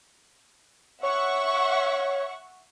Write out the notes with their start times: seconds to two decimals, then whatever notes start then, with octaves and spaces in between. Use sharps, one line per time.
1.03 C#5 E5 F#5 C#6